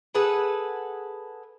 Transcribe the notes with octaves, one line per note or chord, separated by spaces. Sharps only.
G#4 A4 B4 F#5